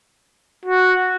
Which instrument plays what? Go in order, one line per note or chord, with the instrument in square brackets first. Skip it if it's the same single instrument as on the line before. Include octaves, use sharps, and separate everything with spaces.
[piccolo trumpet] F#4